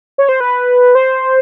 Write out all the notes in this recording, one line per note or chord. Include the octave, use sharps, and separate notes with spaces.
C#5
C5
B4
C5